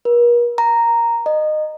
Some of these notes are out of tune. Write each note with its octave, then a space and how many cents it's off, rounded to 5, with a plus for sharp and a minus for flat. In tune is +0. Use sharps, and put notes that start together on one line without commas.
A#4 +45
A#5 -5
D#5 -20